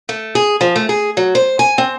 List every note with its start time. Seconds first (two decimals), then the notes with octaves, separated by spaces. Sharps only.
0.09 A3
0.35 G#4
0.61 F3
0.76 A3
0.89 G#4
1.17 F#3
1.35 C5
1.59 G#5
1.78 C4